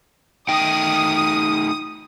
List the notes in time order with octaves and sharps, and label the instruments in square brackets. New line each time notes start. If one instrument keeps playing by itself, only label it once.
[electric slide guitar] A3 D#4 G5 [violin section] D#6